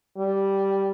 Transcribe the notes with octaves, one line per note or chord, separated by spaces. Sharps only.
G3